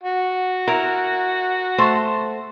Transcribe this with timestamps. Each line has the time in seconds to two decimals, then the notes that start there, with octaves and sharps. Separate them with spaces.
0.03 F#4
0.67 E4 A#4
1.78 A3 C5